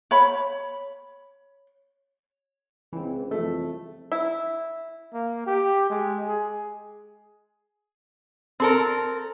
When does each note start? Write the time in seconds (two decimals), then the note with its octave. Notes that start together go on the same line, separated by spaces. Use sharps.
0.11 C#5 B5
2.93 C#2 E3 C4
3.31 C2 F2 A3
4.12 E4
5.14 A#3
5.46 G4
5.90 G#3
6.28 G#4
8.60 C4 A4 A#4